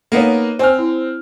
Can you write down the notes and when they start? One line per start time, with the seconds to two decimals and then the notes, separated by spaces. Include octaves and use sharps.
0.12 A#3 B3 D#4 A4 C#5
0.59 C4 C5 G#5 F6
0.79 E4